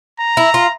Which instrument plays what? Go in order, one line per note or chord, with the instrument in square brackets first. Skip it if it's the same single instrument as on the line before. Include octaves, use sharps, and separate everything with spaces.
[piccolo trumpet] A#5
[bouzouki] E4
F4